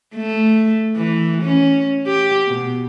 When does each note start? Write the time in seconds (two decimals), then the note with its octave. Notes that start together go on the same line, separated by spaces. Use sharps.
0.15 A3
0.96 E3
1.42 C#4
2.07 G4
2.47 B2